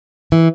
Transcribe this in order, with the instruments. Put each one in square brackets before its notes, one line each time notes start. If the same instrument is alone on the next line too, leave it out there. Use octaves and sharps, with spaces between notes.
[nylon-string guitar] E3